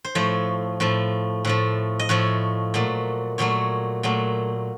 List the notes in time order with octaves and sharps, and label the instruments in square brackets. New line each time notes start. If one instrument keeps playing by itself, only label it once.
[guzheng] C5
A2 F3 A3 C#5
A2 F3 A3
A2 F3 A3
D#5
A2 F3 A3 C#5
A#2 F#3 A3
A#2 F#3 A3 C#5
A#2 F#3 A3